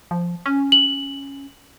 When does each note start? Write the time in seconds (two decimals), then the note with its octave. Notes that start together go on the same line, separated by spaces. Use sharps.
0.11 F3
0.46 C#4
0.72 F#7